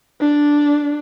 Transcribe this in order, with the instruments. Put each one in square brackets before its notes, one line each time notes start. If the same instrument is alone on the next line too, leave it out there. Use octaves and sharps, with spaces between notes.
[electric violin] D4